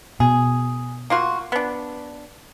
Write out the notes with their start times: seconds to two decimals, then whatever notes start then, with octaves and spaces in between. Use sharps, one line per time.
0.20 B2 G#4
1.10 A#3 F4 F#4
1.52 B3 D4